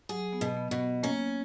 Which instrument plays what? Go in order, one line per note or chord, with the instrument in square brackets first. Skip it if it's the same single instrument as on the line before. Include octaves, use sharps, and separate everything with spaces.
[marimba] F#3 [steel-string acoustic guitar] G#4
[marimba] B3
[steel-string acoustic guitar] B2
[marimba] B3
[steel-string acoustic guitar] B2
[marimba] B3
[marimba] A#3 [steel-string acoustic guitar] C#4